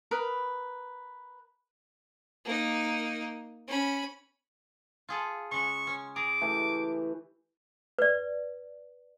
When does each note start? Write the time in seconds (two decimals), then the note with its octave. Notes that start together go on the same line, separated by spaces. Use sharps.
0.11 A#4 B4 B5 D#6
2.45 A#3 D#4
3.68 C#4 B5
5.09 F4 G#4 A4
5.51 C#3 G#3 C#6
5.87 C#4
6.16 G#4 A#5 D6
6.42 E3 A3 G4
7.99 B4 D5